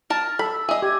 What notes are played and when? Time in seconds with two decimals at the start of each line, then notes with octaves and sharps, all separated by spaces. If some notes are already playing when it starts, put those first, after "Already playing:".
0.10 A#4 A5 F6
0.39 A4 B5
0.52 E6
0.69 G#4 D#5 E5
0.82 G4 G#6